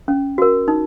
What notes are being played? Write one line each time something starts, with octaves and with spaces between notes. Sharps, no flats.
C#4
F#4 A#4
D#4